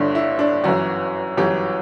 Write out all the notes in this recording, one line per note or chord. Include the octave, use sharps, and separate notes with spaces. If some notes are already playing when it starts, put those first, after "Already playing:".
Already playing: G1 G2 D3 D4 E4
E4
D4
G1 F#2 E3 F#4
G1 F#2 E3 G4